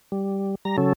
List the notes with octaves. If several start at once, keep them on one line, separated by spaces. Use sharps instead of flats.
G3
G3 A#5
C#3 F#3 C#4 A4